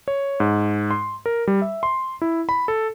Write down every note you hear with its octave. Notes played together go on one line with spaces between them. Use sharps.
C#5
G#2
C6
A#4
G3
E5
C6
E4
B5
A4